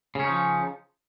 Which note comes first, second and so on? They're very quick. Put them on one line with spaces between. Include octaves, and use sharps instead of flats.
C#3 C#4 D#4 F3